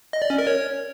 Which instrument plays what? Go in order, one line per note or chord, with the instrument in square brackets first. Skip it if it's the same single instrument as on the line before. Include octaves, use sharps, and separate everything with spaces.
[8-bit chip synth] D#5
D5
C#4
A#4
C#5